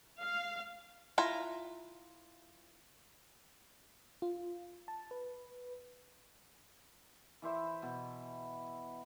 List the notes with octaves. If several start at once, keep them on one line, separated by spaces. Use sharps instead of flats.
F5
E4 F4 A#5
F4
A5
B4
E3 E4 C5 E5
B2